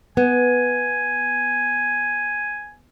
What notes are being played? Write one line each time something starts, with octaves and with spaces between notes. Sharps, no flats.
B3 G#5